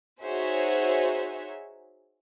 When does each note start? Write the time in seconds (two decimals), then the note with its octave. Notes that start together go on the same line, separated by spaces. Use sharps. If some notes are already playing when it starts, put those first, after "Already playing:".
0.24 D#4 F#4 G#4 C5 C#5 E5